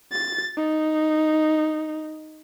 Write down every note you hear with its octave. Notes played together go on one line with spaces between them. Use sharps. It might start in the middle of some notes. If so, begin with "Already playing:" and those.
A6
D#4